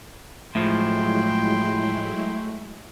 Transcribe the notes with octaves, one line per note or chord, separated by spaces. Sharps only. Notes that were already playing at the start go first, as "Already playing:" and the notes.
A2 F3 F#3 G#3 A3 E4 G5 C6